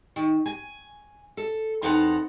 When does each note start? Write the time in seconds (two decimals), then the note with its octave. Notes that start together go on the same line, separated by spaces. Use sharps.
0.16 D#3
0.46 G#5
1.37 A4
1.82 E2 C4 D#4 A4 F#5 A#5